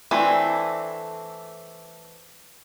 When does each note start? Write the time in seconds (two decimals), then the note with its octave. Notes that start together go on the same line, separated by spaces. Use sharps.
0.11 E3 A3 C4 D4